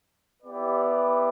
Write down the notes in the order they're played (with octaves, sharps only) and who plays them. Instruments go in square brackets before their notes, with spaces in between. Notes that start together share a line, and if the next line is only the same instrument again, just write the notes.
[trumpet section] B3 E4 G4 B4 D5